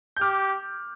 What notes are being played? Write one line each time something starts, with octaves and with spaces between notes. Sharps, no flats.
G6
G4 D6 F6